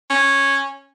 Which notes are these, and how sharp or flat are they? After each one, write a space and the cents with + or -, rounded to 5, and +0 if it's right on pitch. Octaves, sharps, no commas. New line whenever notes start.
C#4 -10